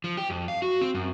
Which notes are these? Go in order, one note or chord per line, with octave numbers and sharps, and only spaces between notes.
F3
G4
F2
F5
F#4
C4
F#2